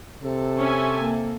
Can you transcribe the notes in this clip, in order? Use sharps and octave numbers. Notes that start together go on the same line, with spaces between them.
C3 A4
C#4 E5 G#5
A#3